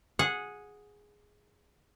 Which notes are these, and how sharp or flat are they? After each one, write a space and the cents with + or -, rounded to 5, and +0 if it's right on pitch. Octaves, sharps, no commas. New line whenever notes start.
G#4 +0 F#5 -15